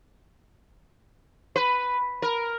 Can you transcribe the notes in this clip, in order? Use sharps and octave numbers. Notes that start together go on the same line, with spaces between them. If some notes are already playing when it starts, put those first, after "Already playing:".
B4
A#4